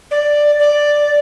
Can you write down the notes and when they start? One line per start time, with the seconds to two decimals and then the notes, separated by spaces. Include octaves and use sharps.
0.11 D5
0.60 D5